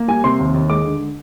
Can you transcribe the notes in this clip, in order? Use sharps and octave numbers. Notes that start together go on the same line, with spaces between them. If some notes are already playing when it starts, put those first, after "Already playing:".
Already playing: A#3
G3 G#5
C3 C6
D#2
D#2
G#3 D6
D3